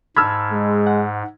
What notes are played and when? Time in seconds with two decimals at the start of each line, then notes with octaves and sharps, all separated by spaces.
0.17 G#2 A5 B5 E6 F6 G#6
0.52 G#3
0.87 F#5